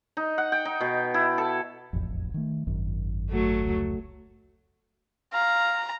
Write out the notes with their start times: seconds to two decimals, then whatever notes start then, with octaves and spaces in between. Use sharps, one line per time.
0.17 D#4
0.38 F#5
0.52 G5
0.65 D#4
0.81 B2
1.14 E4
1.38 A4
1.93 E1 A1 F2
2.34 D#3 A3
2.67 G#1 F#2 D#3
3.30 F#3 A3
3.64 F1 C#2
5.34 F5 A#5